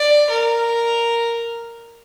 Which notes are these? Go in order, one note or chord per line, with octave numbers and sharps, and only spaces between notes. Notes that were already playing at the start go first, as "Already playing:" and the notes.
Already playing: D5
A#4